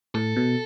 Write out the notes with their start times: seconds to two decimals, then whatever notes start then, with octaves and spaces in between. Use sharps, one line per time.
0.15 A2 A4
0.36 B2